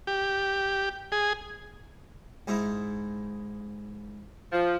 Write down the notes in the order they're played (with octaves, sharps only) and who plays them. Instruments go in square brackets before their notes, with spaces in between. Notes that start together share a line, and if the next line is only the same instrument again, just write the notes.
[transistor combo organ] G4
G#4
[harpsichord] G#2 D#4 E4
[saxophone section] F3